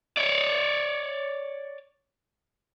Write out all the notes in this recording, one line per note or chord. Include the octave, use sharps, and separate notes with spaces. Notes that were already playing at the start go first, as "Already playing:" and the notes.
C#5 D5